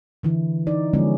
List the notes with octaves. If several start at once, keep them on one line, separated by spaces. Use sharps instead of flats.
D3 E3 E4
D#4 D5
D3 F3 G#3 B3 C#4